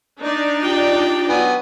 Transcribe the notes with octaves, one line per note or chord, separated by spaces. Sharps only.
D4 D#4 D5
F4 G4 G5
F#3 B3 G#5